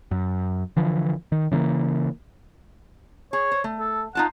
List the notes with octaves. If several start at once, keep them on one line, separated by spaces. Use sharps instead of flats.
F#2
D3 E3 F3
D#3
C#3 E3 A3 A#3
G#4 C#5
C5
A3
A4
D#4 F4 F#5 A5